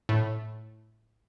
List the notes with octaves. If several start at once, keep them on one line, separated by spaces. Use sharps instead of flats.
A2